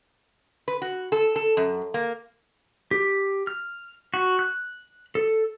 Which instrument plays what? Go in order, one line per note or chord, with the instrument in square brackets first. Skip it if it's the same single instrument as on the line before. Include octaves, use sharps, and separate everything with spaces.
[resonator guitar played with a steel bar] B4
F#4
A4
A4
F#2
A#3
[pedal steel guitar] G4
F6
F#4
F#6
A4